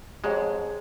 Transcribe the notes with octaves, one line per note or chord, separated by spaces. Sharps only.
F2 G#2 G#3 G4 G#4 C#5